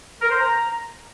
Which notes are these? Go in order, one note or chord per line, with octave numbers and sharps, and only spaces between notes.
A#4
C5
A#5